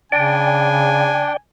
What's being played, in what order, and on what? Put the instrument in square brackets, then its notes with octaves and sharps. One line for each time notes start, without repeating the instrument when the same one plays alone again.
[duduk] C#3 [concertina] D4 [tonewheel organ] D5 G5 [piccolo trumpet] G#5